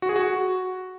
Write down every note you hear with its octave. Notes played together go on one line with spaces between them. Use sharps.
F#4
G#4
F#4